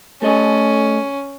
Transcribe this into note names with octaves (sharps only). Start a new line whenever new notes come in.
A3 C#4 A4 D#5